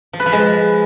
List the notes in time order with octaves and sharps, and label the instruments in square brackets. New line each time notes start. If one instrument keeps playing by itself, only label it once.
[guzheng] F3
B4
F3
G#3